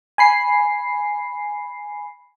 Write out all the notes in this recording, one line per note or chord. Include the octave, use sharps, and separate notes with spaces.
G#5 B5 C7